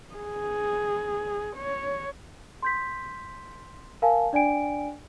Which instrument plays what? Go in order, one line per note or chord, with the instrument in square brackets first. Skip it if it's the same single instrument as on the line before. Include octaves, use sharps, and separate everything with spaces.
[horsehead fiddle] G#4
C#5
[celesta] C6 G6 B6
A#4 F5 G#5 A5
D4 D5 G5 G#5 D7